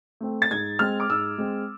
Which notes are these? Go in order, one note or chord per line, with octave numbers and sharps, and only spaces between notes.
A3 C4
A6
G#2 G#6
G#3 C4 F6
D6
G#2 E6
G#3 C4